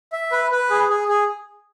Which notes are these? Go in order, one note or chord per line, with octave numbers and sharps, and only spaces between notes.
E5
B4
B4
G#4
G#4
G#4